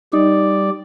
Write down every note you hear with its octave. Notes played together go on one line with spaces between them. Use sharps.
G3 D#4 D5